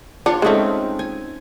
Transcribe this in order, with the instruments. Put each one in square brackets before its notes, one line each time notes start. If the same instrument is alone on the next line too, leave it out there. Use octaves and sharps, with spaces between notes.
[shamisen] D4 [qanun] F4 C#5
[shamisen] G#3 A3 [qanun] C4 C#4 D#4
[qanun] G#5